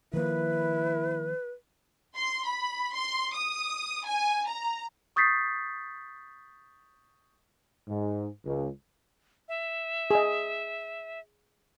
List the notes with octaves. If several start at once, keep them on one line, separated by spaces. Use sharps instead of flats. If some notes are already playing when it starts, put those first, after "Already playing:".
D#3 F3 A#3 E4 B4
C6
B5
C6
D#6
G#5
A#5
C#6 D#6 G6 A6 B6 C7
G#2
C#2
E5
G#4 D#5